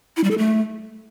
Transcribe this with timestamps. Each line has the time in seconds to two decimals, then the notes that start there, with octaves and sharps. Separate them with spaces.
0.17 E4
0.24 G3
0.31 A4
0.38 A3